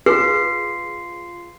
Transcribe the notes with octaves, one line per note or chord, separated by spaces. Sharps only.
F4 G#4 B4 C7